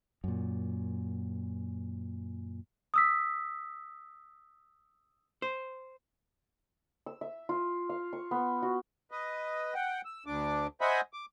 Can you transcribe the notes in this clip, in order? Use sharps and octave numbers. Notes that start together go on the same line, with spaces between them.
F#2 A#2
D#6 E6 B6
C5
E6
E5
F4
F5
C#6
B3
F#4
B4 D#5
F#5 G5
E6
D2 D4 D6
C5 D#5 E5 F#5 G#5 B5
D6